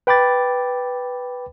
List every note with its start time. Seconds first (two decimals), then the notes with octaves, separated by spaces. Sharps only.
0.07 B4 G5 B5 D6 A6